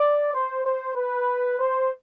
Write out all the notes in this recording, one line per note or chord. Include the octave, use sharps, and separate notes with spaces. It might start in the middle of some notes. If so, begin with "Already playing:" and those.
Already playing: D5
C5
C5
B4
C5